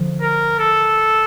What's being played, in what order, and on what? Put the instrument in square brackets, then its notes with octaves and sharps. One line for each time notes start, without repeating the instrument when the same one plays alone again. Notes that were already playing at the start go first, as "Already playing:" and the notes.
Already playing: [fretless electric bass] D3 F3
[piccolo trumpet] A#4
A4